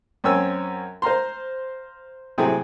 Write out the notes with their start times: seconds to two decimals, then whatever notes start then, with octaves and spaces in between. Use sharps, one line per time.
0.24 F#2 C4 C#5 G#5 E6
1.02 C5 F5 A#5 C6
2.38 A2 C3 F#3 C4 G#4